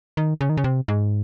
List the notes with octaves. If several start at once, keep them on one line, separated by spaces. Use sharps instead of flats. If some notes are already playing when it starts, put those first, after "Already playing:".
D#3
C#3
D#3
C#3
C3
G#2